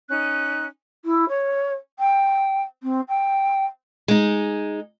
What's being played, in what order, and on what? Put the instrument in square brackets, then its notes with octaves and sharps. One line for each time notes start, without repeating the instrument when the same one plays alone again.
[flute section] C#4 D#4 F#6
[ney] E4
C#5
G5
C4
G5
[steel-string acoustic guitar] G#3 D#4